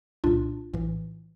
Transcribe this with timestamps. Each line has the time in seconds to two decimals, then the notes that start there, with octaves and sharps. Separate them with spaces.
0.24 C2 A#2 D4 F4
0.74 A#1 A2 E3